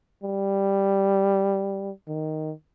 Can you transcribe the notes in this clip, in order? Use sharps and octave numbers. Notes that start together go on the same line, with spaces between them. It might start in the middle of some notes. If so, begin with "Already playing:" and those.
G3
D#3